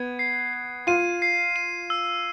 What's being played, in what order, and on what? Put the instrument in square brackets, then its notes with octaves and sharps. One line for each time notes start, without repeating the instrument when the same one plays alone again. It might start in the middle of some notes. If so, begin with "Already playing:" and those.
Already playing: [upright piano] B3 [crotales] G#6
[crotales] C7
C7
[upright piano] F4 [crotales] D#7
[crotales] C7
D#7
E6